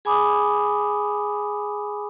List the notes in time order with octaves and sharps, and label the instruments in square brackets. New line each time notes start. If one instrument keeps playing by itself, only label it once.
[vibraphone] G#4 G#5 B5 D6 D#6